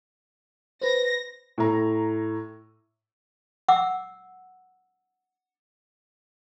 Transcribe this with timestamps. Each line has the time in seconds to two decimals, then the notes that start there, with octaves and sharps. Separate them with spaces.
0.81 B4 C5 A#6
1.58 A2 A#5
3.68 F#5 D6 E6